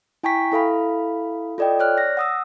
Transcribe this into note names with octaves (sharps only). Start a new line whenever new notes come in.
E4 G5 G#5 A#5 C#6 B6
E4 A4 F5 B5
F4 A4 D5 D#5 G5
C#5 D5 F6 F#6
A#6
F#5 D#6 E6